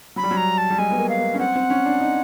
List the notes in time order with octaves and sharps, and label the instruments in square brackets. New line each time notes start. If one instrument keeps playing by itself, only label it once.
[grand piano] F#3 [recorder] B5
[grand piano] G3
F#3
[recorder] A#5
A5
[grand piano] G3
[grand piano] G#3 [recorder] G#5
[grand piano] B3
A#3
[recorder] F5
[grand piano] A#3
C#4
[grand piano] C4 [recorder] F#5
[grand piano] C4
C#4
D4
D#4